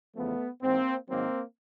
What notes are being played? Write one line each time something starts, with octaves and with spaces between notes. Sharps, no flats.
E2 C#3 F3 A3 B3
G#2 E3 A#3 C4
G#2 D#3 F#3 A#3 C4